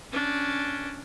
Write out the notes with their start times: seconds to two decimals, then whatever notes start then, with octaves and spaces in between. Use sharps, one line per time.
0.12 C#4 D4